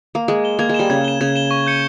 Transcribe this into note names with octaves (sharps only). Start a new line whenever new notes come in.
A#3
G#3 G#6
E7 G7
A#3 G#6
G#3
G3 E7 G7
C#3 G#6
E7 G7
C#3 G#6
E7 G7
C#6
G6 C#7